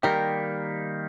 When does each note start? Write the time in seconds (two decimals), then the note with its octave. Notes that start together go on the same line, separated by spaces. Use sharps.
0.03 D#3 G3 A#3 G4 A#4